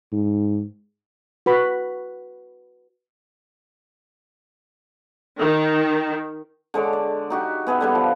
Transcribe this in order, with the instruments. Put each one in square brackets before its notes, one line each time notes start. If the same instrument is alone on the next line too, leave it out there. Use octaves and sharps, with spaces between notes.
[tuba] G#2
[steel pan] F#4 B4 B5
[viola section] D#3
[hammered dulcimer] D3 G#3 C#5 D6
D5
D#4 F#4 G4
B3 G#4 B4 E5
D3 G3 B3
F3